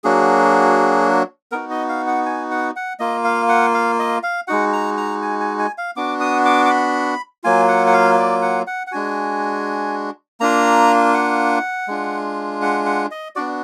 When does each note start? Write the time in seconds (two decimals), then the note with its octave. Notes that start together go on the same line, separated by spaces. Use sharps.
0.04 F#3 A#3 D4 F#4 G#4
1.52 B3 D#4 F#4 A#4
1.71 D#5
1.89 F5
2.07 F#5
2.26 G#5
2.51 F#5
2.76 F#5
3.00 A#3 F4 D#5
3.24 F5
3.49 F#5
3.74 F5
3.99 D#5
4.23 F5
4.48 G#3 D#4 F#4 F#5
4.73 A#5
4.97 A#5
5.22 G#5
5.40 G#5
5.59 G#5
5.78 F5
5.96 B3 D4 F#4 D6
6.20 D#6
6.45 D6
6.65 D6
6.70 B5
7.44 F#3 A#3 F4 G#5
7.68 F#5
7.87 F#5
7.93 F5
8.18 D5
8.42 F#5
8.67 F#5
8.87 F#5
8.92 G#3 D4 F#4 G#5
10.40 A#3 D4 F4 A#5
11.14 F#5
11.88 G#3 D4 F4
12.62 F#5
12.86 F#5
13.11 D#5
13.35 B3 D4 F#4 D5